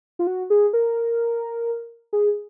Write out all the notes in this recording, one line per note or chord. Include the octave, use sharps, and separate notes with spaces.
F4
F#4
G#4
A#4
G#4